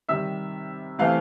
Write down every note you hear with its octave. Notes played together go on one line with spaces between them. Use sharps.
C3 D#3 G3 E5 E6
C3 E3 A3 C4 F5 F6